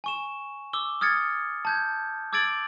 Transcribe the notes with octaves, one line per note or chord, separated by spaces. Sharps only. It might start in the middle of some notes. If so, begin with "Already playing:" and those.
G#5 C#6 E7
D6 E6 G7
D#6 F6 G#6 A6 C#7
A5 G6 G#6
D6 E6 G#6 A6 D7 F#7